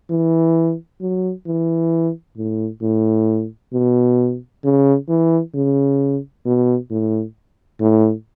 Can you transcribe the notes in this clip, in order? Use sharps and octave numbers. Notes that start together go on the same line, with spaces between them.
E3
F#3
E3
A2
A2
B2
C#3
E3
C#3
B2
A2
A2